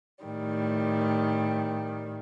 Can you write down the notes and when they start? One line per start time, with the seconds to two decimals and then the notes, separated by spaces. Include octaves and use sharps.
0.23 A2 D#3 G3